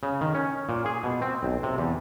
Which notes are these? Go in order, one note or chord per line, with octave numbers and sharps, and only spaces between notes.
C#3
D#3
C#4
A#2
G#4
B2
C4
B1
C3
E2